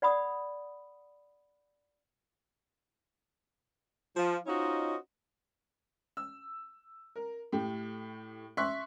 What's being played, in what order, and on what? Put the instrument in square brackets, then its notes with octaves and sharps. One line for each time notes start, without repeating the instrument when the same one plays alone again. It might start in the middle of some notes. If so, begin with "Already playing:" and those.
[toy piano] D5 F#5 B5 D#6
[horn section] F3
C#4 D#4 F4 F#4 C5 D#5
[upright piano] E6
A#4
A2 A3 G4
E5 C6 C#6 F#6 B6